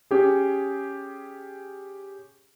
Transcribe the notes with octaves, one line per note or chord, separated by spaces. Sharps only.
C#4 G4 G#4